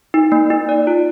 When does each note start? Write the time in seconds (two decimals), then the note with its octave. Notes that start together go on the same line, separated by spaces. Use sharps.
0.14 D#4
0.32 A#3
0.50 D#4
0.69 D5
0.87 F4